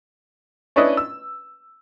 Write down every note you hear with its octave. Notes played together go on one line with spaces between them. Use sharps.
C#4 D4 E4 B4 D#5
E6